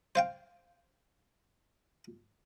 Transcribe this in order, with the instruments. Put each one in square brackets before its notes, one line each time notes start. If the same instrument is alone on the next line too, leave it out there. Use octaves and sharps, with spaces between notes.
[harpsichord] C5 F5 G5